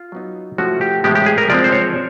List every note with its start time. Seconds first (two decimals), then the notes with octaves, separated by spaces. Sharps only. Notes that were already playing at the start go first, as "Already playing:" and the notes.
Already playing: F4
0.12 F#3 B3 D#4
0.58 F3 A3 C#4 E4 F#4
0.81 G4
1.04 A2 E3 G#3 B3 G4
1.15 G4
1.26 G#4
1.38 A#4
1.50 F3 G#3 C4 D5
1.64 C5
1.72 C#5